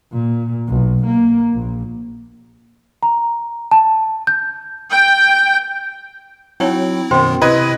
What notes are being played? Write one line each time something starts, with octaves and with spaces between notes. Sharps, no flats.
A#2
B1
A#3
A#1
A#5
A5
G6
G5
F#3 C4 D#4 E4 C#5 G5
F#2 B2 D#3 B3 C5 G5 C6
C3 C4 E4 B4 D#5 G#6